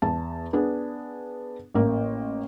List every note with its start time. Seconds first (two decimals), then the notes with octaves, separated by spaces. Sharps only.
0.02 E2 A5
0.53 B3 D4 G#4
1.74 A1 A#3